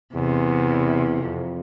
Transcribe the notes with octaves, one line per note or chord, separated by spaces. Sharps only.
E2 C3
F2